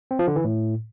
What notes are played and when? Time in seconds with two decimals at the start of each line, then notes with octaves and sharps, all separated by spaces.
0.11 C4
0.19 F3
0.27 D3
0.36 E3
0.44 A2